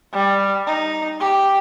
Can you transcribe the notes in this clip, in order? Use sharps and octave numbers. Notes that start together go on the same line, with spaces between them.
G3
D#4
G4